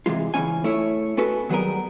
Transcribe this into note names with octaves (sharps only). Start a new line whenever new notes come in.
C3 E3 G#3 F4
C#3 E3 F#3 C4 C#4 G#5
A3 E4 C#5
B3 C#4 F#4 A4 B4
D#3 F#3 G3 B3 G#4 A#4